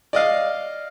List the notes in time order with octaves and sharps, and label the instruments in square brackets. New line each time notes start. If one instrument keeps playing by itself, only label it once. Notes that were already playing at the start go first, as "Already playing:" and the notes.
[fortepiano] D5 D#5 F5